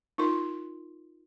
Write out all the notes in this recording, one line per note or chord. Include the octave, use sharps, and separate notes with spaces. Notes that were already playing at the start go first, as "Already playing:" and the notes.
D#4 F4 A#4 C6